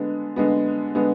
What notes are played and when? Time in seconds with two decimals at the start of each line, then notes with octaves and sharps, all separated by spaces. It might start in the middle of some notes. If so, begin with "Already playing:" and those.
Already playing: D3 G#3 B3
0.36 D3 G#3 B3
0.95 D3 G#3 B3